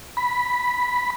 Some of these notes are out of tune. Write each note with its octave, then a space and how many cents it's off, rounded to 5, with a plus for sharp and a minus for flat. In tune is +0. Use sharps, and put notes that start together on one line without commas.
B5 -5